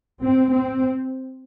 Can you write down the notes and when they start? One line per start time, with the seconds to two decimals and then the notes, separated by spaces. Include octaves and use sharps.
0.21 C4
0.51 C4